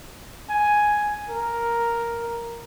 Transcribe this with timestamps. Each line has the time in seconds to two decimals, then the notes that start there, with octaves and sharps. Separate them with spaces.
0.49 G#5
1.29 A#4